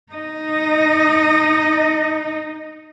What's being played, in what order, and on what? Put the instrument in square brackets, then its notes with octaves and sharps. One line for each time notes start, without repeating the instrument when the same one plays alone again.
[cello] D#4 D#5